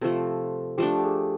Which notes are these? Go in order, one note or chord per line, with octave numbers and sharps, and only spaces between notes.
C3 F3 A3 A4
F3 A3 D4 G4
G4
G#4